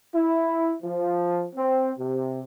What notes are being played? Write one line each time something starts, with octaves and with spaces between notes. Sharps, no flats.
E4
F3
C4
C3